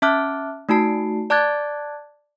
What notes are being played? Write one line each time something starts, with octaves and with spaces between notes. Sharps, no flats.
C#4 E5 A5 D6 F6 F#6
A3 D#4 F#4 A5 C7
D5 A5 D6 F#6 G#6 A6